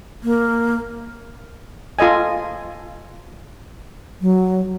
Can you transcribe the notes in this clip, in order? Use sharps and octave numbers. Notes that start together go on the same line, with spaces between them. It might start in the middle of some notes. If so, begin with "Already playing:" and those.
A#3
F4 A4 D#5 G#5
F#3